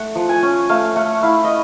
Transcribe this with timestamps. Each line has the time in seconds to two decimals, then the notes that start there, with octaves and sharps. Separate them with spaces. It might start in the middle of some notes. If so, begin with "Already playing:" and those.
Already playing: A3 F#5
0.15 F3
0.29 G#5
0.43 C#4
0.69 A3 F5
0.96 A3 F#5
1.23 E4 F5
1.44 D#5